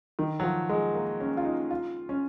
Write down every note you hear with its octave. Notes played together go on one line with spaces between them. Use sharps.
D#3
F#3
F3
G#3
A#3
C#4
F4
D#4
F4
C#4